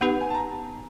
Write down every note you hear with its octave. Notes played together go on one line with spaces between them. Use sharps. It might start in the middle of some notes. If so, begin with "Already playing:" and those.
B3 D#4 G4 B4 F#5
G#5
A5
A#5